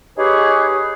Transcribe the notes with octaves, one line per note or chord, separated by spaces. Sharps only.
D#4 G4 G#4 B4 C#5